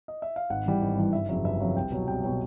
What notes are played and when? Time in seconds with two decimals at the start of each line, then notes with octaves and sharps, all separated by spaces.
0.08 D#5
0.22 E5
0.36 F5
0.50 G#1 F#5
0.66 G2 E3 G3
0.82 G#1
0.97 G2 E3 G3
1.13 G1 E5
1.29 F2 C#3 F#3 E5
1.44 G1 E5
1.60 F2 C#3 F#3 F5
1.76 C2 G5
1.92 B2 F#3
2.07 C2 G5
2.23 B2 F#3 G5